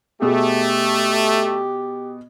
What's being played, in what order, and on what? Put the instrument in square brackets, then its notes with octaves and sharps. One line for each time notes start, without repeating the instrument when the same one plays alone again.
[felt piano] B2 B3 G#4 [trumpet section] A3 [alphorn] G4